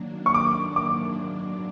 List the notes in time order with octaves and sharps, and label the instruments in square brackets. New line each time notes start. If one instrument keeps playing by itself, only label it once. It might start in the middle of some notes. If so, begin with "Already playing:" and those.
Already playing: [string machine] D#3 F#3 A#3 D4
[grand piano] C#6
D6
D6